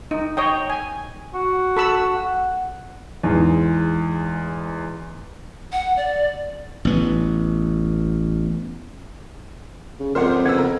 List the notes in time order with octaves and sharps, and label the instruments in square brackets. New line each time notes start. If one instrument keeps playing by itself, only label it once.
[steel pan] D#4
C#5 D#5 G5
G#5
[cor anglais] F#4
[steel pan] A4 B5 E6
[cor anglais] F#5
[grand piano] E2 G#2
[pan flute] F#5
D5
[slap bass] A1 B3
[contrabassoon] C#3
[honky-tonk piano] G#1 C5 C6 [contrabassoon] F2 [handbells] A#4 F#5
[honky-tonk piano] C#3 B3 E6 [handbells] F#5 G#6
[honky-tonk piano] A#4